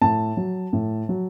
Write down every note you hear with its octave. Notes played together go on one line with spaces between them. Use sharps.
A2 A5
F#3
A2
F#3